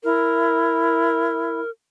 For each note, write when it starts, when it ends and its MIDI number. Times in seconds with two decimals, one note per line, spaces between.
0.04 1.60 64
0.04 1.70 70